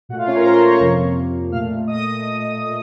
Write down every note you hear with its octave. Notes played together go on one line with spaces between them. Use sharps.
A#2 A3 F#4 F#5
F4 F5
C#4 C#5
A#4 A#5
C5 C6
C#5 C#6
F2 C3 F3 A#3
A#2 A3 F5 F6
D#5 D#6